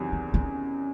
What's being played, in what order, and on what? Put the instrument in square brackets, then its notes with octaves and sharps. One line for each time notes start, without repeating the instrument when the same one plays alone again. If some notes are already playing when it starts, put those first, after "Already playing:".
Already playing: [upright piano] E2 C3 D#3 F#3
[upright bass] C#4
C#4